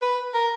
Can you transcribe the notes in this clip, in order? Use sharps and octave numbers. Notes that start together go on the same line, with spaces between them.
B4
A#4